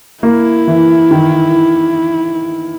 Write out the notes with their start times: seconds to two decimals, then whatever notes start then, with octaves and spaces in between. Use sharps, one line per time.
0.23 A#3 E4
0.68 E3
1.11 D#3